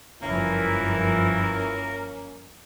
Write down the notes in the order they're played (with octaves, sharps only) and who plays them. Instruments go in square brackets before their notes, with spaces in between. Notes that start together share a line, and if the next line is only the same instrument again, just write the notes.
[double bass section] F#1 G2 F3 [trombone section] E3 E4 [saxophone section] A#3 C#4 [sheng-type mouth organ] A#4